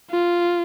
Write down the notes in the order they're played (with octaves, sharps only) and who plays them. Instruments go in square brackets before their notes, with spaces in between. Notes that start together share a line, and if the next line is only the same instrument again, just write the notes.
[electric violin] F4